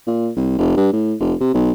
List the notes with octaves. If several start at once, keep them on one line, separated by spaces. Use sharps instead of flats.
A#2
C2
F1
G2
A2
F1
C3
B1